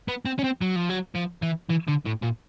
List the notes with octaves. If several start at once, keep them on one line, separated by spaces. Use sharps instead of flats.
B3
C4
C#4
C4
F#3
F3
F#3
F3
E3
E3
D3
A2
A#2